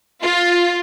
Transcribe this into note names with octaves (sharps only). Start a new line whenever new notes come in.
F4